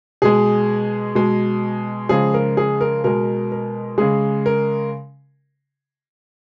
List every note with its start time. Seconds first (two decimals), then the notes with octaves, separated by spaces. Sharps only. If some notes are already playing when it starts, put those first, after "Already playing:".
0.22 B2 G#3 G#4
1.15 B2 G#3
2.09 C#3 F3 G#3 G#4
2.34 A#4
2.57 G#4
2.81 A#4
3.04 B2 G#3 A#4
3.52 A#4
3.98 C#3 G#3 G#4
4.46 A#4